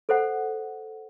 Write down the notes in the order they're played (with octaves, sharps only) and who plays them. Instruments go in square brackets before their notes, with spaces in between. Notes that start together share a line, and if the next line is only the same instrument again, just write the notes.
[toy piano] A4 C5 F#5